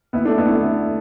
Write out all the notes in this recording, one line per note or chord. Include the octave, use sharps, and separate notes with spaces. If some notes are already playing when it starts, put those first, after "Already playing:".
D2 B3 E4
A3 D4
D2 B3 E4
A3 D4
D3